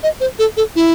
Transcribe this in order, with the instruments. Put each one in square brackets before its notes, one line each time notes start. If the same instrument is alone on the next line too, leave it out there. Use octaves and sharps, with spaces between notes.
[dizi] D#5
C5
A4
A4
E4